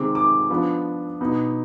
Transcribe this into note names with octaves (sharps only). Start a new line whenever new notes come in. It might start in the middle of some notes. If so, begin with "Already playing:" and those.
Already playing: C3 D#3 G#3 C4 D6
D6
F3 B3 D4
B2 B3 D#4